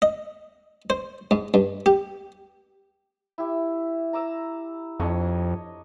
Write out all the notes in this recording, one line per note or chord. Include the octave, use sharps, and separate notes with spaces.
D#5
C5
G#2
G2
G4
E4 G4
A#5 D6 E6
F2 D4 C#5 D#5